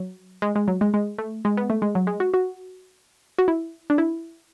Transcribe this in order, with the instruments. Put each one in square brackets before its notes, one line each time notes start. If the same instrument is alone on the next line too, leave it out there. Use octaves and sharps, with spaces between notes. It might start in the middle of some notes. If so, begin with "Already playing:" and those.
Already playing: [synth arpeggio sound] F#3
G#3
G#3
F#3
G#3
G#3
A3
G#3
B3
A3
G#3
F#3
G#3
F#4
F#4
F#4
E4
D4
E4